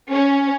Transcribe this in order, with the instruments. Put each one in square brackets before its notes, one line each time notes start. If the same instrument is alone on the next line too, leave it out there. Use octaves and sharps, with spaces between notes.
[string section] C#4